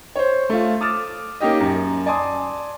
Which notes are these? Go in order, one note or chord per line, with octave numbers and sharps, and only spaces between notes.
C5 C#5
A3 F4
D6 D#6 F6 A6 E7
A#3 C#4 D#4 G4 D#5
F#2
D5 G#5 A5 C6 D#6